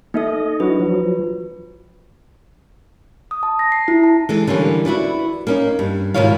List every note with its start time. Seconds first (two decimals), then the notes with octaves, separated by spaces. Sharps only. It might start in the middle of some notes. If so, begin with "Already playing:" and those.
0.14 A#3 D#4 A4 D#5 E5
0.60 F#3 D4 E4 F#4 B4
0.80 F3 F#3
3.31 D#6
3.43 A5
3.59 A#6
3.72 C7
3.88 E4
4.04 A5
4.29 E3 G#3 A4
4.47 D3 E3 G3 A#3 C#4
4.85 E4 F#4 B4 D5
5.47 A#3 C#4 D#4
5.79 G2
6.14 G#2 B2 D#3 E4 C#5 F5